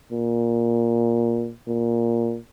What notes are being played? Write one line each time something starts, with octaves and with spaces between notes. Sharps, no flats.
A#2
A#2